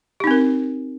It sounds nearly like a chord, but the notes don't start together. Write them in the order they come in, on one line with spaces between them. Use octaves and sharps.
G4 D#4 C4 A#4